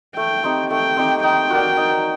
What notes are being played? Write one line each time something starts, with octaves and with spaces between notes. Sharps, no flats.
A3 G5
C4 D#4 G4
A3 G5
C4 D#4 G4
D#4 G5
F#4 A#4 D5
D#4